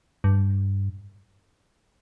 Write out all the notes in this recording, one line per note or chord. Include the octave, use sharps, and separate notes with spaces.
G2